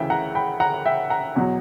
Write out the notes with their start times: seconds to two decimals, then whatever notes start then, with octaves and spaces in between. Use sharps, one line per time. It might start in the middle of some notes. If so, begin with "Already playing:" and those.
Already playing: D2 C#3 E3 E5 G5
0.10 F#5 A#5
0.35 G5 B5
0.60 F#5 A#5
0.86 E5 G5
1.10 F#5 A#5
1.36 E2 B2 F#3